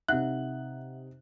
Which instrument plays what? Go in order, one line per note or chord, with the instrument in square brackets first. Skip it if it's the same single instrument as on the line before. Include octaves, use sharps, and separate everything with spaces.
[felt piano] C3 D#4 [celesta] E5 F#5 [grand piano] F#6